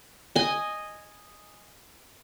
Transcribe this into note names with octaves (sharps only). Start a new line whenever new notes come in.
D#5 G#5